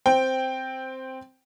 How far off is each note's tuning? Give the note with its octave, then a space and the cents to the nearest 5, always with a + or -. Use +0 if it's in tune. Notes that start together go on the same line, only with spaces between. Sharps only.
C4 +0 G5 +0